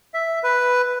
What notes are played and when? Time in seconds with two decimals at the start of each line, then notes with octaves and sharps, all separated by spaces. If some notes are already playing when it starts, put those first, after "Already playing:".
0.14 E5
0.44 B4